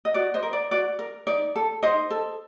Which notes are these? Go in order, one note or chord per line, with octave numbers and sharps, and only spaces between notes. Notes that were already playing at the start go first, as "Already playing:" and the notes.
D#5
F#4 D5
C5 D#5
A#4
D5
F#4 D5
A#4
D#4 D5
A4
D#4 C5 D#5
A4